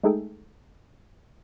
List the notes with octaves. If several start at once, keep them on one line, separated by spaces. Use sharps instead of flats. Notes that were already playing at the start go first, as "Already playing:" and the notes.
G#3 A3 D#4 G#4 A4 G5